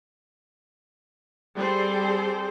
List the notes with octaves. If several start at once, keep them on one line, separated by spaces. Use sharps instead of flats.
G3 C4 G#4 A4 C5